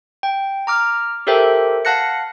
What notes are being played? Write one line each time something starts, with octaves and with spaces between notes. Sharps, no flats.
G5
A#5 D6 F6
G4 A4 A#4 C5 E5 G5
F5 F#5 A5 F#6 A#6 C#7